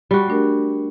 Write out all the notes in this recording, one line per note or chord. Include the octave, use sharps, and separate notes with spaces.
G3 F#4
A3 D4 A#4